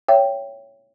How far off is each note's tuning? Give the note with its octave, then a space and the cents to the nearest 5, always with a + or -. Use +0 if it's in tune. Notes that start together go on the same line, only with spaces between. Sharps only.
C#5 +10 E5 +45 G5 +0